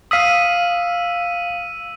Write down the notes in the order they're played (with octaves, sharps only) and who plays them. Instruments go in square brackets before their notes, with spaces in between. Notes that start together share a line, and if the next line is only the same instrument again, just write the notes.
[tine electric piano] F5 D#6 [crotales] E6 B6 D#7